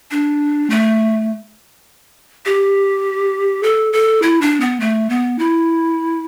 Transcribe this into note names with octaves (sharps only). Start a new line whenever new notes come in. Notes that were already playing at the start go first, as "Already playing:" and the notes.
D4
A3
G4
A4
A4
E4
D4
B3
A3
B3
E4